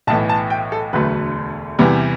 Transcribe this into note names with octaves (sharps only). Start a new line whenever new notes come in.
B1 A2 E3 A5
A5
G5
A4
E1 D2 D3 F#3 A3 B4
E2 C3 E3 G3